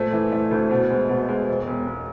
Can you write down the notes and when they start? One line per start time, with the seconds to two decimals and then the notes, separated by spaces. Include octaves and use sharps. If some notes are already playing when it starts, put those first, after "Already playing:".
Already playing: A#2 A3 C5
0.13 E3
0.32 A3
0.51 D2
0.71 B2
0.90 G#3
1.09 B2
1.29 G#3
1.48 E1
1.67 E1
1.87 E1